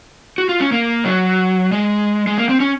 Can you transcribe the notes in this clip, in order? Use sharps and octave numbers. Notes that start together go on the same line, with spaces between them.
F#4
F4
C#4
A#3
F#3
G#3
G#3
A#3
C4
C#4